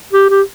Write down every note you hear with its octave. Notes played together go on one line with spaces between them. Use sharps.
G4
G4